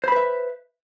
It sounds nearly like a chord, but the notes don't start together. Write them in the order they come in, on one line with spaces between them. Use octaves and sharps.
C5 B5 B4 E5